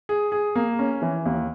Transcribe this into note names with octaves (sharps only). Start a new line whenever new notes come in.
G#4
G#4
A#3
C#4
E3
D#2